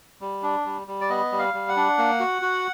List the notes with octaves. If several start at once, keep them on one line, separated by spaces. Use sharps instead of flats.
G3
D4
G3
G3
D5
B3 D#5
G3
F5
G3
F#5
D4
A#3
F#4
F#4